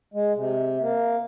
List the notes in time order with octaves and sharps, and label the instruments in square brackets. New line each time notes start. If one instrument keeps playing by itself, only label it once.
[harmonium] G#3
C3
A#3